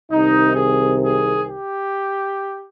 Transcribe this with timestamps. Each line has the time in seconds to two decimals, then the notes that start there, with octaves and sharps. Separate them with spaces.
0.11 C2 C3 D#3 D#4
0.56 G#4
1.01 G#4
1.46 G4